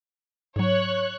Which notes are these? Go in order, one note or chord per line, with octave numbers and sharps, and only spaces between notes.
G#2 F#3 C#5 F#6